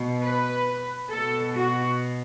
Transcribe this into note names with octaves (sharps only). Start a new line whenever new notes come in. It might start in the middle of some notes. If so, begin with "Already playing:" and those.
Already playing: B2
B4
B2 A4
F#4